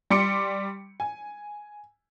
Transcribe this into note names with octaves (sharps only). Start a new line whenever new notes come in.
G3 C6 D6 C#7 D7
G#5